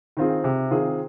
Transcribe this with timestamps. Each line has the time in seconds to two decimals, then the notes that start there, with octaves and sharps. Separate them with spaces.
0.17 D#3 C4 F4 G#4
0.44 C3
0.71 D#3 C4 F4 G#4